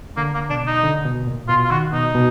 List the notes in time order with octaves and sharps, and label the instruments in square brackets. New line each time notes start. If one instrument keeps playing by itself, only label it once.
[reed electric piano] D3 [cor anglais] A#3
[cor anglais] A#3
[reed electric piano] B2 [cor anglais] D4
[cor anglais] D#4
[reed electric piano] D3
B2
A#2
[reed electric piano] B2 [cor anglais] F4
[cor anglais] F4
[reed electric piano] D#3 [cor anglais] F#4
[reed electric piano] B2 [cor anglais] D#4
[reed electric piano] B2